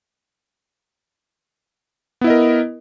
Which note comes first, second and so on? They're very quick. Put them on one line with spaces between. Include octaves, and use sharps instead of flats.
B3 E4 D#5 A#4